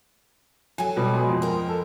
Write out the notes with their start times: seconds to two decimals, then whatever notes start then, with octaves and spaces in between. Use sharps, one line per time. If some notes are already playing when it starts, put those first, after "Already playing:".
0.78 F#3 A4 G#5
0.97 B2 G3
1.12 G#3
1.29 F2
1.42 A#4 G5
1.69 A4